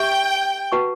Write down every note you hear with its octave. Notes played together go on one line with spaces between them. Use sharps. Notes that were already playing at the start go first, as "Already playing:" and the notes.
Already playing: G4 E5 G5 C#6
F#4 B4 F#5 A5 C#6